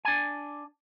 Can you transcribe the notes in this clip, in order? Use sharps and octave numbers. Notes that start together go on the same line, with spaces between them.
D4 G#5